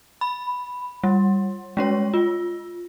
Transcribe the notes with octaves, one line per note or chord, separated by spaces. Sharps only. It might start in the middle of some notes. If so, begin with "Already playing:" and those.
B5
G3
G#3 C#4 C#5
F4